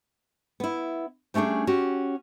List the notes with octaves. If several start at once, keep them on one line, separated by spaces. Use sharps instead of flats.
B3 E4
G3 A3 C#4 D4 G#4
C#4 F#4 G4